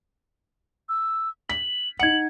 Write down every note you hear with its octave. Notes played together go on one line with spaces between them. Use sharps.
E6
B6 F#7
D#4 F#5 G#6 C#7 F#7